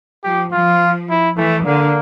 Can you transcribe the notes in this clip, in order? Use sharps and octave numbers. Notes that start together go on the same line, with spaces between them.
F3 G4
F3 F4
E4
E3 A3
D3 A#3